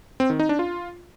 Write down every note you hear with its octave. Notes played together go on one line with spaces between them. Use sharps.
C4
D#3
D#4
D4
F4